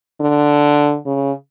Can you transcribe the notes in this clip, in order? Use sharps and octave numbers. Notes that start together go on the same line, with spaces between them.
D3
C#3